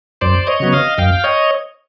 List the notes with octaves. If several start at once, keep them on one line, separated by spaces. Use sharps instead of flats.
F#2 C5 D5
C#5 D#5
C#3 F#3 B3
D#5 F5
F#2 F5 G5
C#5 D#5